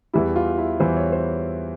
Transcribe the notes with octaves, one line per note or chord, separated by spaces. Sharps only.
E2 E3 G3 E4
F4
E4
E2 E3 G3 C5
C#5
C5